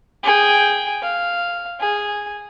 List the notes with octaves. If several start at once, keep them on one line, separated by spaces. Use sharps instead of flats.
G#4 G5
F5
G#4